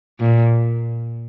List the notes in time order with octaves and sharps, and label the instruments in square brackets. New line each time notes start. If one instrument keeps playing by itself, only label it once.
[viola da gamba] A#2